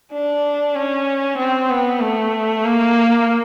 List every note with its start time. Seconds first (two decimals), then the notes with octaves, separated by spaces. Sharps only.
0.13 D4
0.76 C#4
1.38 C4
1.70 B3
2.01 A3
2.64 A#3